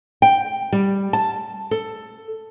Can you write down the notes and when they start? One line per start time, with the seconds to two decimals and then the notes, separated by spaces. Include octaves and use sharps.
0.22 G5
0.73 G3
1.13 A5
1.71 A4